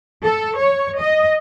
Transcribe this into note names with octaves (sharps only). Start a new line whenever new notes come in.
A4
C#5
D#5